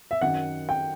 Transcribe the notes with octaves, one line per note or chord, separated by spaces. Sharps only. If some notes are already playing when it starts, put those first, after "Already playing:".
E5
F#2 D#3 F#5
G5